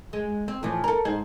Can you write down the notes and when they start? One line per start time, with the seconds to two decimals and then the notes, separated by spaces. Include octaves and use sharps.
0.13 G#3
0.48 C4
0.63 A2 E3 F3
0.84 A4 A#4
1.05 G#2 G#4 C5